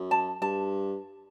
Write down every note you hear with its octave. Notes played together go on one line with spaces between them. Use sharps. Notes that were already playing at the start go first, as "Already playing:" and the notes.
Already playing: F#2
A5
G2 A5